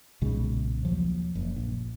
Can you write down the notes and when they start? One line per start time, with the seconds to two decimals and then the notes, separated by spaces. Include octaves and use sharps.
0.22 B1 A#2 C#3 G#3
0.83 D#2 F3 F#3
1.35 F#1
1.56 A#1